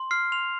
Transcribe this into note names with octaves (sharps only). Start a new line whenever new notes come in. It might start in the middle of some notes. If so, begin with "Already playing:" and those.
Already playing: C6
F6 C7
C6 F7